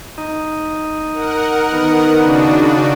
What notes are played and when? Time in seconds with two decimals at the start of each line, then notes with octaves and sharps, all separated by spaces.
0.18 D#4
1.14 A#4 F#5
1.73 D#3 B3
2.18 C#3 D4 F#4